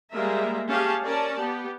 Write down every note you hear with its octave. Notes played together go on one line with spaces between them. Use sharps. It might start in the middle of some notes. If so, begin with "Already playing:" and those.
G3 G#3 A#3 A#4 E5
C#4 G4 G#4 F5 A5
C#4 A#4 D5 A5
B3 G4